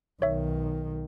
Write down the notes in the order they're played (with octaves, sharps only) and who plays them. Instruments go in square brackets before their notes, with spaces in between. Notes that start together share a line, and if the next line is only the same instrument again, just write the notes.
[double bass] B1 D#3 [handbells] C#5 E5